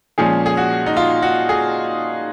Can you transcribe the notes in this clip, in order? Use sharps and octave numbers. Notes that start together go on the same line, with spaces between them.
A#2 F3 G#3 C#4 G#4
G#4
F#4
D#4
F4
F#4
G#4